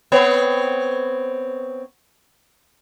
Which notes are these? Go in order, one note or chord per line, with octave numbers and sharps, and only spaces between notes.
B3 C4 C#5